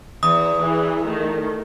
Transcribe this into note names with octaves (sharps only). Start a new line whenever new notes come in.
E2 D#6
E3 G#4
D#3 A3